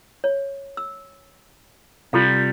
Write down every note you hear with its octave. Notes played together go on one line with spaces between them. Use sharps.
C#5
E6
C3 G3 F4 A4 F5